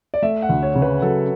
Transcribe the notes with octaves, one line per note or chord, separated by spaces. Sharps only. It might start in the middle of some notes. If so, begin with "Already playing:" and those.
D5
A3 E5
F#5
D2
C#5
C#3
B4
F#3 A4